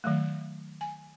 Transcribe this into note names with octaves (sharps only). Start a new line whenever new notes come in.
D#3 F#3 A3
G#5